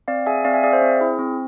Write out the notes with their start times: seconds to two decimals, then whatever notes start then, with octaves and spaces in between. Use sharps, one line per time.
0.08 C4 D5 F5
0.26 G#4 E5 G#5
0.44 C4 D5 F5
0.54 E5 G#5
0.63 G#4 D5 F5
0.72 C5 E5
0.82 C4
1.00 E4 G#4
1.19 C4